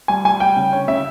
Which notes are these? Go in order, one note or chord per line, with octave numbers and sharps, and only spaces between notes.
G3 G#5
G3 G#5
G3 G5
C#3
C#4
C#3 E5